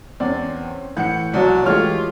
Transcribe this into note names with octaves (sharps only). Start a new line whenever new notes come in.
E2 C4 C#4 D5
A2 E3 F#5 G6 C#7
C2 B2 F#3
E3 G#3 A3 F4 G4 C#5 F6